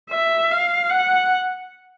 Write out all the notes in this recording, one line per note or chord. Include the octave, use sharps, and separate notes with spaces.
E5
F5
F#5